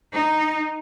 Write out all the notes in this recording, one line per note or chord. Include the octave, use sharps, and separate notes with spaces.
D#4